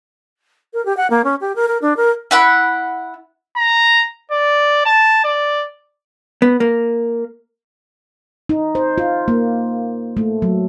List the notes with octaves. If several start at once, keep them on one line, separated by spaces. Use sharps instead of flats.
A#4
G4
F#5
A#3
C#4
G4
A#4
A#4
D4
A#4
E4 F#5 B5
A#5
D5
A5
D5
B3
A#3
D#4
C5
F4
A#3
A3
F#3